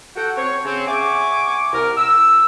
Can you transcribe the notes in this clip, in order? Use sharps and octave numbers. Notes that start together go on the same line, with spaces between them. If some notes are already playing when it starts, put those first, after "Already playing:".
F#4 A4 F#5 G5
C4 C#5
C#3 C4
E5 F#5 G#5 C#6 D6
C2 A#4
E6